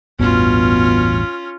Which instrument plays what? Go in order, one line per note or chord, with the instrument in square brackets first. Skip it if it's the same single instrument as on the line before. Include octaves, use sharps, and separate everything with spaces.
[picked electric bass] A1 E2 G2 [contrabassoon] B2 [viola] C#4 F4